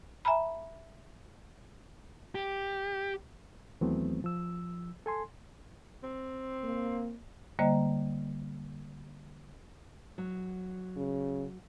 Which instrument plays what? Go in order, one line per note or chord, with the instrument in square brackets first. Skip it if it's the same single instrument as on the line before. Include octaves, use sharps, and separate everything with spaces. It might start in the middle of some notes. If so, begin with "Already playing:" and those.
[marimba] E5 G#5 A#5 B5
[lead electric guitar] G4
[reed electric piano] D#2 E3 F#3 A3 B3 C4
F3 E6
A4 G#5 C6
[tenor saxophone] C4
[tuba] A#3
[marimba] D3 G3 A#3 C5 D#5 A#5
[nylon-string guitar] F#3
[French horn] C#3